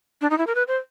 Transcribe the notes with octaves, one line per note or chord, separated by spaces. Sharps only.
D4
D#4
E4
A#4
B4
C5